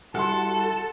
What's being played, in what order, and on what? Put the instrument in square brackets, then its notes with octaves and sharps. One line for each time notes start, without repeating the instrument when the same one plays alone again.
[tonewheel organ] G3 E4 F#4 [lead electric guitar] A4 [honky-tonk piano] F#5 C6 [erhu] A5